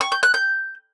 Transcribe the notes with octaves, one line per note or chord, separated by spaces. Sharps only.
C#6
G6
F#6
G6